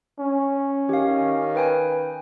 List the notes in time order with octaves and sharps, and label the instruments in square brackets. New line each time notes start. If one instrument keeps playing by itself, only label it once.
[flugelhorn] C#4
[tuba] D#3 [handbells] G4 F5
[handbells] B4 G5 G#5